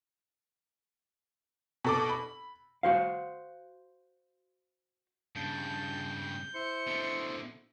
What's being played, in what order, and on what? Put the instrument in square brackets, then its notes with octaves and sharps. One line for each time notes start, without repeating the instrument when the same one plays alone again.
[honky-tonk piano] B2 A4 D6
B5
[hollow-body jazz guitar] F#4 C5 F5
[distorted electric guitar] G2 C#3 [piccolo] A5 [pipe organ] G6
[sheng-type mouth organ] E4 C5 C6 [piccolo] C#7
[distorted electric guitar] B2 D3